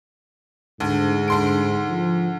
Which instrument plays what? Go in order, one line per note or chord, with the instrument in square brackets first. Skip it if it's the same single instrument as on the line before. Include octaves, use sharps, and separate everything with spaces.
[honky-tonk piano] D2 [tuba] G#2
[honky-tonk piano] D2 C6 D7
[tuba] F3